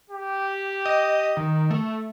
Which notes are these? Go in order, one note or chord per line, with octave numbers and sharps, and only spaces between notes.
G4
D#5
D#3
A3